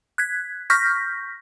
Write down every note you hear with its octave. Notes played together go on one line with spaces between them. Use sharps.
F#6 G#6 B6
C#6 F6 G6 A#6 B6